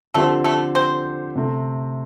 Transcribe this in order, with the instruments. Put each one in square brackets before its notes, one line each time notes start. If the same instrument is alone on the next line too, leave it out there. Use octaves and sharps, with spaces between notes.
[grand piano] D3 F3 C4 G4 C5 [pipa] A3 A4
[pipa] A3 A4
C4 C5
[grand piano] C3 A3 C4